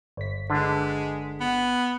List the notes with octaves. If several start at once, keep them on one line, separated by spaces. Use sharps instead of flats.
G1 B6
D3 G#3 D4 B4
B3